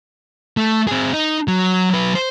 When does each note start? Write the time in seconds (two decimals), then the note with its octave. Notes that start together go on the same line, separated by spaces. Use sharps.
0.57 A3
0.87 C4 G#4
1.13 D#4
1.48 F#3
1.91 F#3 B4
2.15 C5